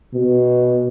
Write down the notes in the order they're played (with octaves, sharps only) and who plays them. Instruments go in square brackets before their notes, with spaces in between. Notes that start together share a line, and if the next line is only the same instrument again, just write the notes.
[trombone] B2